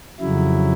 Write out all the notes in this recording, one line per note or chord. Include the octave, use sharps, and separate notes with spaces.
F2 C#3 F#3 E4